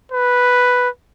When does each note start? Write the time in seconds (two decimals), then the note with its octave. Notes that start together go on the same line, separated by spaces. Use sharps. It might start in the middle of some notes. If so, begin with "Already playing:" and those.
0.12 B4